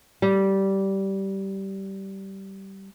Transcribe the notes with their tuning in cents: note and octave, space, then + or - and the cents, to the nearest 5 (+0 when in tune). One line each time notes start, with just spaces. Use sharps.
G3 -15